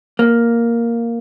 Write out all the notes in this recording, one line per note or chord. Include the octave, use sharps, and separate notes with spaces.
A#3